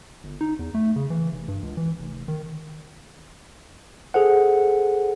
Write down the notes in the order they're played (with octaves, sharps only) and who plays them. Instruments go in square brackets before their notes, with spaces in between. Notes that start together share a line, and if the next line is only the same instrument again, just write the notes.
[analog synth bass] G1
D#4
E2
A3
C#3
E3
F1
G2
C#2
E3
F1
D#3
[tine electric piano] G#4 A4 C5 F#5